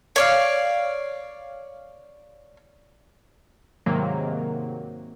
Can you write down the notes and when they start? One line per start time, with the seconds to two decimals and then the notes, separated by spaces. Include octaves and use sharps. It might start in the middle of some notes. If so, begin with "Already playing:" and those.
0.16 C#5 D5 F5
3.86 G#2 C3 D#3 F#3 A#3